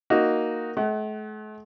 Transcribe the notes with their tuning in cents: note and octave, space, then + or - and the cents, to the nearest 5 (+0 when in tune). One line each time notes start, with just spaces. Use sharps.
A#3 +0 D#4 +0 F#4 +0
A3 -45 F#5 +35